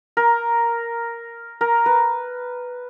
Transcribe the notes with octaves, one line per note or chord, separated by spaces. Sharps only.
A#4
A#4
B4